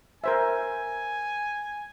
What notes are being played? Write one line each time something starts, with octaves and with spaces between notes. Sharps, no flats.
A#4 C5 E5 G#5